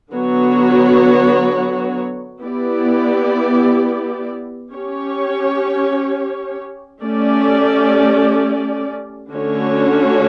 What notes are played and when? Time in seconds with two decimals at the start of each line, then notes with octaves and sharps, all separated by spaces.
0.13 D3 F#3 B3 F#4 C#5
2.43 B3 E4 G4 D5
4.73 C#4 G4 C#5
7.02 A3 C#4 G4 D5
9.32 D3 A3 C#4 F#4 C#5